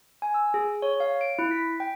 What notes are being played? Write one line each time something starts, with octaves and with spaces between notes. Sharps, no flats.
G#5
E6
G#4
C#5
F5
D7
E4
B6
G5